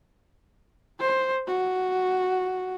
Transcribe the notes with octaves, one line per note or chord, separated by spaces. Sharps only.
C5
F#4